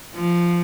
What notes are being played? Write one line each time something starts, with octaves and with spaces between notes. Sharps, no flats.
F3